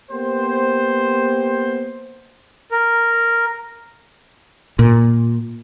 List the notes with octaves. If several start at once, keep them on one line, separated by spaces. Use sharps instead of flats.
A#3 B3 G4 C5
A#4
A#2